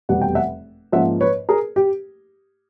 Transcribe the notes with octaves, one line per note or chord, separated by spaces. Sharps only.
F1 E2 B2 G3 F#5
G5
E5 F#5
G#2 F3 A#3 C#4 E5 F#5
B4 C#5
G#4 A#4
G4